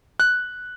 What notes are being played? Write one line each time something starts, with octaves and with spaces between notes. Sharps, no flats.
F#6